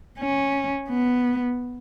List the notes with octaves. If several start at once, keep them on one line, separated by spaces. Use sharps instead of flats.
C#4
B3